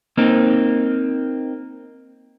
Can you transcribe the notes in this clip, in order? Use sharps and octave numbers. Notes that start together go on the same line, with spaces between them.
A#3 C4 D#4